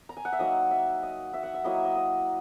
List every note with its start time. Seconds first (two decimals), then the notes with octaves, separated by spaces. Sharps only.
0.09 A#5
0.17 G#5
0.25 F#5
0.33 E5
0.39 F#3 A#3 D#4 D#5
0.71 E5
1.03 D#5
1.33 E5
1.43 F#5
1.54 E5
1.64 F#3 A#3 E4 D#5
1.75 E5
1.85 D#5
1.96 D#5